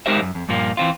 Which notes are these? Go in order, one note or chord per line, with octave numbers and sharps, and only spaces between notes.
G#3 D#4 G4 A#4 C5 E5
F#2
F2
G2 A#2 F3 A#3
E3 C4 F4